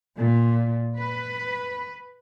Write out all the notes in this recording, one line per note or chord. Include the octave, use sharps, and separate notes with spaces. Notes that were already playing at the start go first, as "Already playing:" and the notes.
A#2
B4